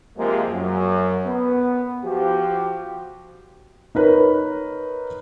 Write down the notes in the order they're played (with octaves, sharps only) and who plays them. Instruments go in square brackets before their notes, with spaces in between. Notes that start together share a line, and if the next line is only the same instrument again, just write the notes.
[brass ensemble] C3 F3 G#3 A#3
F#2
B3
F3 F#4 G4
[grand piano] D#4 A#4 B4 C#5